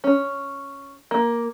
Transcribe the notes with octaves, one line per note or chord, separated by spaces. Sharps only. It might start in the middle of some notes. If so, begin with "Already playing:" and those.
C#4
A#3